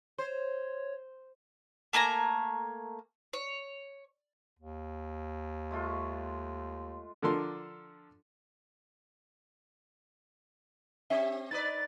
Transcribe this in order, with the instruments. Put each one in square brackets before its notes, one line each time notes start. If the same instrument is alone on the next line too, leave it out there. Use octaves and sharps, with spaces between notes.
[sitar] C5 [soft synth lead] C#5
[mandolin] A3 A#3 G#5 A#5
C#5
[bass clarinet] D#2
[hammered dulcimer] G#3 A3 F4
[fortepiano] D3 F3 D4 A4 A#4 C6
[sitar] C4 G4 [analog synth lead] E5
[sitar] D#4 B4 D5 [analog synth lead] A6